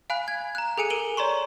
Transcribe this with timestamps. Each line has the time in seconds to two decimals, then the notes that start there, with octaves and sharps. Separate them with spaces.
0.10 F5 G#5 B5 F#6
0.28 G#6
0.55 A#5 F#6
0.78 G#4 A4 G#5 C#7 D#7
0.90 A#4 D7 D#7 F#7 G7
1.17 C#5 D5 A#5 C6 C#6